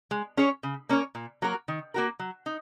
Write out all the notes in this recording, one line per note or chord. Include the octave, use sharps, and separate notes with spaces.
G#3
C#4 G#4 C#5
C#3
A#3 C#4 A#4 C#5
A#2
F#3 A#3 F#4 A#4
D#3
A#3 F#4 A#4
F#3
D#4